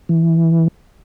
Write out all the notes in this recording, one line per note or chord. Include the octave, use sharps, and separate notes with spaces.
E3